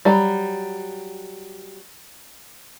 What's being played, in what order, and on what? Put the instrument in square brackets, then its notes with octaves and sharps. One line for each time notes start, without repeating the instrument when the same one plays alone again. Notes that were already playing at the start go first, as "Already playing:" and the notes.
[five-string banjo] F#3 G3